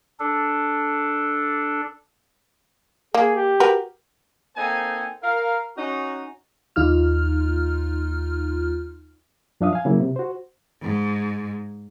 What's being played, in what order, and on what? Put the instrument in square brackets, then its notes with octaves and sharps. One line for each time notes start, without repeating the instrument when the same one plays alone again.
[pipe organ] D4 A4
[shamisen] A#3 [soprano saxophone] G#4
[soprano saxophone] G4
[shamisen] F#4 A#4 B4
[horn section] A#3 C4 D#4 A4 C5 G#5
A#4 F5
C#4 D#4 F#4
[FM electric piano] D#2 D#4 F4 F6
[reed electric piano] F#2 F3 D4 E5 F5 D#6
F5 G#5
C#3 F#3 A#3 E4
C3
F#4 C5
[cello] G#2